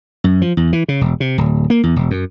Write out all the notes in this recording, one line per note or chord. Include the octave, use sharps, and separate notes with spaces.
F#2
F3
E2
E3
C#3
E1
C3
D1
A#3
E2
E1
F#2